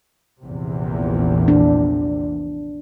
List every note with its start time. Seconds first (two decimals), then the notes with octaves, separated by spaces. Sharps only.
0.43 A#1 E2 C3
1.48 D4